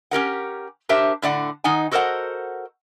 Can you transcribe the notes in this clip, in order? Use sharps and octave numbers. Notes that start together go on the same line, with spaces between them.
C#4 G4 A#4 F#5
D4 G4 A#4 C5 E5
A2 D3 D5 F#5
D#3 D#4 F#5 G#5
F#4 A4 A#4 C5 D#5 F#5